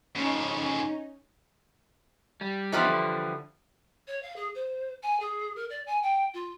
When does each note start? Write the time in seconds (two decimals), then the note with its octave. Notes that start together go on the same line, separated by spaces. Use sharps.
0.15 F2 C#3 C#4 D#4
2.41 G3
2.72 E3 F3 G3 B3 D#4
2.85 D3
4.07 C#5
4.22 F5
4.36 G#4
4.54 C5
5.03 G#5
5.20 G#4
5.56 A#4
5.69 D5
5.86 G#5
6.02 G5
6.33 F4